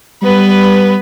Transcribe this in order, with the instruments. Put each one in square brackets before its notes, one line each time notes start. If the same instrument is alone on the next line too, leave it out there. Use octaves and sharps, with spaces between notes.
[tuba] G3 [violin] B3 B4